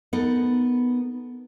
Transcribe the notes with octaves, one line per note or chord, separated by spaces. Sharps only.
B3 D#4 A4 A#4